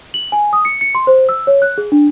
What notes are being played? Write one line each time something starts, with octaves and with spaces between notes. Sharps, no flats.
F#7
G#5
D#6
C#7
C#7
C6
C5
E6
C#5
F#6
G#4
D4